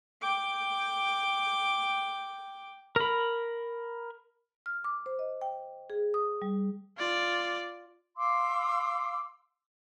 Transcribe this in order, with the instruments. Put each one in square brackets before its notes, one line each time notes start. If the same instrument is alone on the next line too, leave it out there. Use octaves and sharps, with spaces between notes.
[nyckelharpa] G5 D6
[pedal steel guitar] A#4 B5
[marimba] F6
D6
C5
D#5
G5
G#4
D#6
G3
[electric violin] F4 D5
[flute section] F5 C6 D6 E6